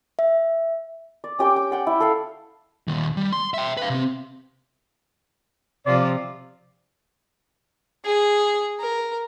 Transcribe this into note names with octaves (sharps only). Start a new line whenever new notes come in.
E5
D5
C#4 G4 G5 D6
G5
D5 F#5 G5
E4
A4 F5 G5
D#2 A#2
G3
C6
E5 G5
B4 F5
C3 C4
C3 F3 F4 D5
G#4
A#4